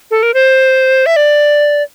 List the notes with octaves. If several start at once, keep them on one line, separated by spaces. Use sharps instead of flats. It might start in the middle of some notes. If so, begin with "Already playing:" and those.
A4
A#4
C5
E5
D5